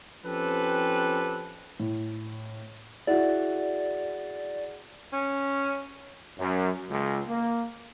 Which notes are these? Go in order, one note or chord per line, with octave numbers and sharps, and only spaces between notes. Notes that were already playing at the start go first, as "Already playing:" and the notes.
F3 C4 C#4 G4 A4 B4
A2
E4 F#4 G#4 D5 F#5
C#4
F#2
C#2
A#3